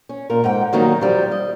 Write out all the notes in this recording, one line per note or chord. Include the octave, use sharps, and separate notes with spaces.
C#4
A#2 A#4
G#2 F#5 G5
D#3 F#3 G3 A#3 D#4
F3 G3
D#5